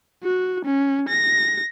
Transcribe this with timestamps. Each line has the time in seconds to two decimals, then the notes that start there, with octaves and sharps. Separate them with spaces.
0.24 F#4
0.65 C#4
1.09 A#6